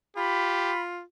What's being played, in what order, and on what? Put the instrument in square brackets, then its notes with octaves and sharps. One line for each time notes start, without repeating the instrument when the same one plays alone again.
[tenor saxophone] F4 [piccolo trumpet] G4 [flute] B5